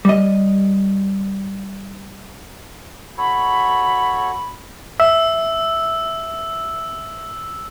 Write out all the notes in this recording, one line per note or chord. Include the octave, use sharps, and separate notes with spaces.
G3 D#5
F#4 A4 C#5 B5
E5 E6